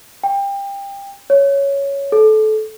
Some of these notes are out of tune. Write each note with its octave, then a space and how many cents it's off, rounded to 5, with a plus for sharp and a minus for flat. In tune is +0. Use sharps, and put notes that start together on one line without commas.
G5 +25
C#5 +5
A4 -25